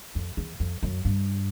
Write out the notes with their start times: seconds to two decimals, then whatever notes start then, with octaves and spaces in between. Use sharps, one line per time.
0.15 F2
0.37 E2
0.60 F2
0.83 F#2
1.05 G2